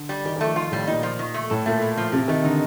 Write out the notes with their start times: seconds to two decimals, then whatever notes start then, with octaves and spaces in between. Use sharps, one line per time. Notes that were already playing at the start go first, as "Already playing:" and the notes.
Already playing: D3
0.09 G3
0.25 D#3 G4
0.36 D#3
0.41 A3
0.46 F3
0.56 D#3 F4
0.72 A2 G3
0.87 A#2 D#4
1.03 F3
1.19 D#3
1.34 A3
1.50 A2 A4
1.66 A#2 A3
1.82 A2
1.97 F3
2.12 A2 C3
2.28 D#3 A3
2.44 D3 D#4